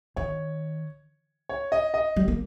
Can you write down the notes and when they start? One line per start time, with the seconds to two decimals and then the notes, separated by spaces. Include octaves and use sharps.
0.16 D#3 C#5
1.49 C#5
1.72 D#5
1.94 D#5
2.16 G3
2.28 A#3